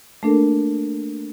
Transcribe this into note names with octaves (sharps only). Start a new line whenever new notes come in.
A3 A#3 D4 A4 A#4